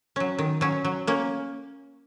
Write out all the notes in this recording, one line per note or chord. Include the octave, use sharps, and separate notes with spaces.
F#3 C#4
D#3
F#3 C#4
F#3
A#3 C#4